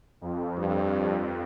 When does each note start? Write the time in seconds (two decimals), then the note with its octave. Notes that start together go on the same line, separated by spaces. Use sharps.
0.21 F2
0.58 G2